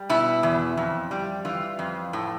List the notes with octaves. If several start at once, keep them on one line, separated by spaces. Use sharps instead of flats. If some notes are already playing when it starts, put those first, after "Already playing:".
Already playing: G3
B2 E4
E2
F2
G3
E3 F4
F2
A2